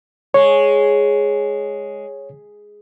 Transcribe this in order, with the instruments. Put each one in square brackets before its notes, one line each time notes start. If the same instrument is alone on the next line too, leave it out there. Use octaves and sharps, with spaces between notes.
[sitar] G#3 [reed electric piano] C#5